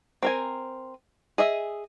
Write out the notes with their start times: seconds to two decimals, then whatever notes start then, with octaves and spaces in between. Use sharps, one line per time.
0.23 C4 A#4 G#5
1.38 G#4 D#5 E5